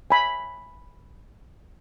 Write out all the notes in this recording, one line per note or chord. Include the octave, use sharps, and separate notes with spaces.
G#5 B5